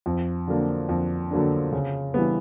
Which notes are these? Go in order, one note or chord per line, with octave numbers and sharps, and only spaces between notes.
F2
D3 F#3 A#3 D4
F2
D3 F#3 A#3 D4
C#3
E3 G3 B3